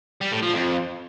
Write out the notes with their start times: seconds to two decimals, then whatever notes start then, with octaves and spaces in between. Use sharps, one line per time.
0.21 G3
0.32 A2
0.42 F3
0.53 F2